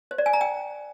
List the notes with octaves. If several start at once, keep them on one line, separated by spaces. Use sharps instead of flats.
C5
D5
G#5
A#5
G5